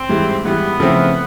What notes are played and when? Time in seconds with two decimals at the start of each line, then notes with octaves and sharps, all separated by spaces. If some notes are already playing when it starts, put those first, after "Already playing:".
Already playing: C4
0.09 G#2 E3 G3
0.44 G#2 E3 G3 B3
0.80 C#3 F3 A3 C4 E4